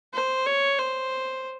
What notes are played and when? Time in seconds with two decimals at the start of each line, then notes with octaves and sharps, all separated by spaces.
0.14 C5
0.46 C#5
0.79 C5